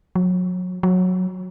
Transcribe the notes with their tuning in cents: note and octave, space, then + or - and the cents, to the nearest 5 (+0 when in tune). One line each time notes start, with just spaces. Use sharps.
F#3 -30
F#3 -15